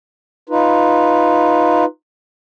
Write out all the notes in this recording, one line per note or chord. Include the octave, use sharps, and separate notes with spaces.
D#4 F4 B4